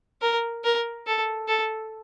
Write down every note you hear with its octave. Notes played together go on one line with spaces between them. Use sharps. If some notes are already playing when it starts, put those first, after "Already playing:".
A#4
A#4
A4
A4